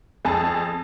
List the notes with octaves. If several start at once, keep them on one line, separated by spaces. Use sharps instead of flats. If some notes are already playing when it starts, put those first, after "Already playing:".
F2 G#4 A5